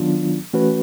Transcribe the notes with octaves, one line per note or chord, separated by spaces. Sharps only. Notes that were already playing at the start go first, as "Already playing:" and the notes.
Already playing: D#3 F#3 B3 D4 F4
E3 A3 C#4 F#4 B4